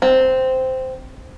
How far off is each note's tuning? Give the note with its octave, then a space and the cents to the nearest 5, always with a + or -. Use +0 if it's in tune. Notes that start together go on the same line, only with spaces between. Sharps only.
C4 -10